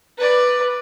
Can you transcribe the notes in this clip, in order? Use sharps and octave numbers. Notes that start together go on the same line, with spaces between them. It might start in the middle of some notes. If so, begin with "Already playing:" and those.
B4 D5